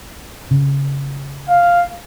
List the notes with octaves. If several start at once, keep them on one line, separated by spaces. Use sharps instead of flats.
C#3
F5